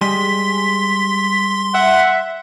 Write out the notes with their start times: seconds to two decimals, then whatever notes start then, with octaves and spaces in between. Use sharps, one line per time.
0.01 G3 G#3 G#4 C6 B6
1.74 E5 F#5